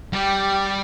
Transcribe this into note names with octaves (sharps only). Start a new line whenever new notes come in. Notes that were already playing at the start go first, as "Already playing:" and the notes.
G3 G4